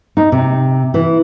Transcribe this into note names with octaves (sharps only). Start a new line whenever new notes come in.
D#4
C3
E3